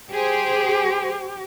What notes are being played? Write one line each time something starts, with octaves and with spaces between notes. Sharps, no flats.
G4 G#4 C5